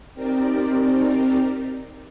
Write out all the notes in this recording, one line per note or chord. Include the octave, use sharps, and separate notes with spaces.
C4 D#4 G4 A#4 D5